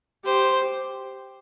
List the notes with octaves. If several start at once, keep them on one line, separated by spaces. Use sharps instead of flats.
G4 C5